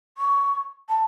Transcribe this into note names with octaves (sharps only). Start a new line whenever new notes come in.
C#6
A5